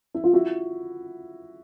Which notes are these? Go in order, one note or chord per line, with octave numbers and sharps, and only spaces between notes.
E4
F4
E4 F#4